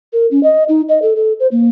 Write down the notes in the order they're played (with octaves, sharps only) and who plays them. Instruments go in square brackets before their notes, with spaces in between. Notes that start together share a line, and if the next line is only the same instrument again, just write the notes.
[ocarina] A#4
C#4
D#5
D#4
D#5
A4
A4
C5
A#3